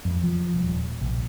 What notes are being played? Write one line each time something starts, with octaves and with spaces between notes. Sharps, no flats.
F2
F3
D#1
A#1